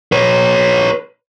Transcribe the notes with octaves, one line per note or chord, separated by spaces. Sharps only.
B4 C#5